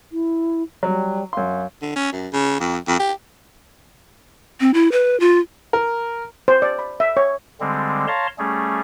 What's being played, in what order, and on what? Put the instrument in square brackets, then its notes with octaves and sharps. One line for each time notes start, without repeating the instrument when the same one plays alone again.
[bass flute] E4
[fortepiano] F#3 [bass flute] G3
[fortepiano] F#2 C6 [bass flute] F5
[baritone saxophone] D3
C#4
F#2
C#3
F2
F2
G4
[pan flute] C4
E4
B4
F4
[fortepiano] A#4
[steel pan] C5
D5
B5
E5
C#5
[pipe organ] D3 G3 G#3 C4
C#5 F5 A5 A#5 C6
G3 A3 C#4 G#4